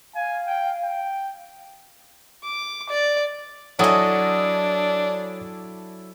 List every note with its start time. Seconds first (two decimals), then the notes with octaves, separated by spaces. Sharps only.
0.15 F5 G#5
0.46 G5
0.82 G5
2.43 D6
2.89 D5
3.79 F#3 D4 E4 A4 C#5 D#5 G#5 D#6